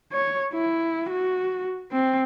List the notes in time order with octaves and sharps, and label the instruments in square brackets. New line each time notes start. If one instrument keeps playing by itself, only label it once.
[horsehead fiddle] C#5
E4
F#4
C4